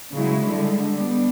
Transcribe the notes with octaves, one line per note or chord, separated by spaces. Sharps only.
C#3 F#3 G#3 E4
D3 G3 G#3
G3 B3 D4